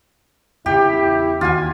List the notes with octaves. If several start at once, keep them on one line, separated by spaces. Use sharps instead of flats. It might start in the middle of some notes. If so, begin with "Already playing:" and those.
E2 C#3 E4 G4
D#2 F4 F#4 G#5